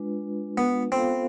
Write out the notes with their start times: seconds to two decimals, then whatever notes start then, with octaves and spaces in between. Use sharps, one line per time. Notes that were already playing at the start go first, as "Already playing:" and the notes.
Already playing: G#3 D4 F4 B4
0.58 B3
0.92 B3 C4 F4 A4 C5 F5